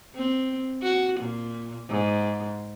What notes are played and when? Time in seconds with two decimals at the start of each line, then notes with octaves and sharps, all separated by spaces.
0.15 C4
0.82 F#4
1.20 A#2
1.89 G#2